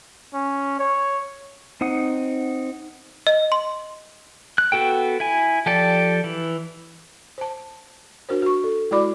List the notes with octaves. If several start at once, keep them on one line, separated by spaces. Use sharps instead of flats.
C#4
C#5
C4 D#4 F#5 D#6
D#5
C6
F#6
B3 F#4 A4 G5
E4 G#5
F3 G4 A4 D5
E3
C5 A5
D4 F#4 A#4 C5
F#4 C#6
A4
G#3 E4 F#4 D5 B5 D6